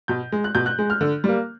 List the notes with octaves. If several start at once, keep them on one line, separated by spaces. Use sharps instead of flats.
B2 G6
G#3
F#6
B2 G6
F#6
G#3
F6
D3
G3 A#3